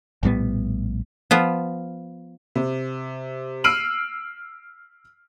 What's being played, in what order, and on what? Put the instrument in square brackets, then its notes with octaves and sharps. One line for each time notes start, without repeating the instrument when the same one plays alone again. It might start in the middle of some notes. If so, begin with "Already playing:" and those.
[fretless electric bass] A#1 A2 G3 B3
[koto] F3 B3 F4
[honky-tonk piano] C3
E6 F6 C7 D7 D#7 F#7